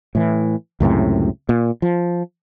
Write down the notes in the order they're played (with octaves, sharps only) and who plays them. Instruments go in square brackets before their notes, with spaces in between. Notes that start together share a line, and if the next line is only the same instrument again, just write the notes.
[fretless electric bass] A2 E3
C#2 F#2 A2 C3
A#2
F3